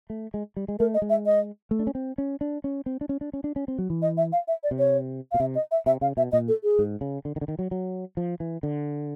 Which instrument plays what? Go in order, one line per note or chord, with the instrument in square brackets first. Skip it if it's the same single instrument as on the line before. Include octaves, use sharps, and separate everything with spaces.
[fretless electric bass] A3
G#3
G3
G#3
[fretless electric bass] A3 [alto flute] A#4
[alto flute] D#5
[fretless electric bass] G#3
[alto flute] E5
D#5
[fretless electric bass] A3
D4
C#4
C4
C#4
D4
C#4
C4
D4
C#4
D4
C#4
D4
C#4
C4
F#3
E3
[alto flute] D#5
E5
F5
E5
D5
[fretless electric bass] C3
[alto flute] C#5
[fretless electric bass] B2 [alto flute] F5
[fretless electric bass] C3 [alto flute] E5
[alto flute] D#5
E5
[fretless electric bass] C3 [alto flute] E5
[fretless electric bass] C#3 [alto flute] F5
[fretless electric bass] B2 [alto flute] E5
[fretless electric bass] A#2 [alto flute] D#5
[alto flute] A4
G#4
[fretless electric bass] G#2
C#3
D3
D#3
D3
D#3
F#3
F#3
F3
E3
D3